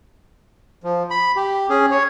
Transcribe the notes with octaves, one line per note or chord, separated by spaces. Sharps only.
F3
B5
G4
C#4 G#4
C#5